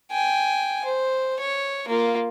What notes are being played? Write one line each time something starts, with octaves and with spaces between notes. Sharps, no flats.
G5 G#5
C5
C#5
A#3 F4